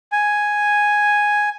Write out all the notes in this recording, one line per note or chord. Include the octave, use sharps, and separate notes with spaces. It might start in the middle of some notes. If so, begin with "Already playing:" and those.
G#5